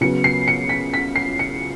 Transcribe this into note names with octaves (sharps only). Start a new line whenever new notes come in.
C#3 F#3 B3 C#7
C7
C#7
B6
B6
C7
C#7